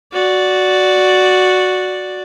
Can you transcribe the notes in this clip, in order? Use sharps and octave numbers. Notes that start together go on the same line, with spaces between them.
F#4 D5